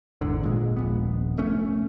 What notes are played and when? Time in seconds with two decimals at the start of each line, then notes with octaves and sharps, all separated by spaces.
0.21 G#1 E2 G#2 D3
0.43 A#2 G#3
0.77 D#1 A#1 B3
1.37 F1 A3 C#4